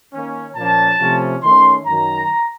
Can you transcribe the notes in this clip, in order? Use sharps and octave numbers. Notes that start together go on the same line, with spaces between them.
D#3 A#3 C#4
A#2 F3 A#3 C#4 A5
C3 F3 A3 C#4
D#3 A3 C#4 C6
F#2 D#3 F#3 A#5